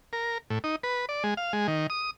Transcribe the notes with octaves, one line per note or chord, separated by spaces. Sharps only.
A#4
A2
D#4
B4
D5
G#3
F5
G#3
D#3
D#6